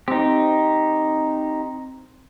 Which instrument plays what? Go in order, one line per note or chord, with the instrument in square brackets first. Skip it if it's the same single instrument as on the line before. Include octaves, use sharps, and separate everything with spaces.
[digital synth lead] C4 [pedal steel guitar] D#4 G4